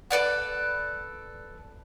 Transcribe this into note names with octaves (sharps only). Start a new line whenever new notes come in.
A4 B4 D5 F#5